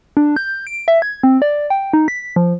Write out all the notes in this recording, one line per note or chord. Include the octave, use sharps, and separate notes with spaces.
D4
G6
D7
E5
G#6
C4
D5
G5
D#4
B6
F3